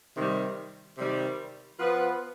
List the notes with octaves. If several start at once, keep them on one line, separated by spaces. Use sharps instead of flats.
C3 D#3 G3
C3 D#3 G3
F3 B3 F4 B4